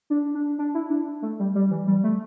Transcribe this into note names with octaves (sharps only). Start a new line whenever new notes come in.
D4
D4
D4
E4
D4
A3
G3
G3
E3
G3
A3